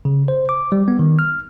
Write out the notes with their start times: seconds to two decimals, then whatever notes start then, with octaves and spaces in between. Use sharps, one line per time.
0.05 C#3
0.28 C5
0.49 D6
0.72 G3
0.88 B3
0.99 D#3
1.19 F6